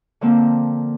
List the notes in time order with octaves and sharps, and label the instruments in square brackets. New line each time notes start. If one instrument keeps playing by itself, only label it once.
[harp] D3 F3 A#3 C4